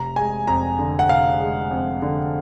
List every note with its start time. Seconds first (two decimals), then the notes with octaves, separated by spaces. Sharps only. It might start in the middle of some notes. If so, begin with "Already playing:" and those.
Already playing: F1 A#5
0.16 G#3 G#5
0.47 F2 A#5
0.79 D3
0.99 F#5
1.09 F1 F5
1.40 G#3
1.71 F2
2.02 D3